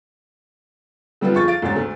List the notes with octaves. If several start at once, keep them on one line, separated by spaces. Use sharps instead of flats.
D3 G3 B3 C4 F4
F2 F4 G#4 C#6 A6
F5 A6 D7
E1 G#2 C#4 A6
D2 A3